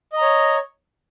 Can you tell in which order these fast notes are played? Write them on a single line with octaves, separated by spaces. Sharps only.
D#5 A#5 C#5